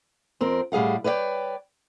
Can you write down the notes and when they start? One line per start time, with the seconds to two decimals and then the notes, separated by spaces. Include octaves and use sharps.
0.41 F2 C4 A#4
0.72 A2 G3 G#4 F5 F#5
1.04 B4 C#5 D5 E5 G5